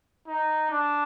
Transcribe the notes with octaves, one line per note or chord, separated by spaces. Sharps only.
D#4
D4